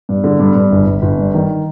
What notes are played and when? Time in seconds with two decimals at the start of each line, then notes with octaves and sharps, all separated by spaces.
0.09 G2
0.24 D3
0.39 G2
0.55 G2
0.72 G1
0.86 G1
1.02 G1
1.19 G2
1.34 D#3